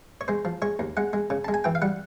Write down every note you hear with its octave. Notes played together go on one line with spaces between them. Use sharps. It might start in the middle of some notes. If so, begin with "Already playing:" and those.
C#5
G#3 C5
F3
G#3 C#5
D#2
G#3 F#5
G#3
C#3
G#3 A5
G#5
E3 G5
F5
G3 F#5